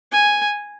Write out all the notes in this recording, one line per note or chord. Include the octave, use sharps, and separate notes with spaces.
G#5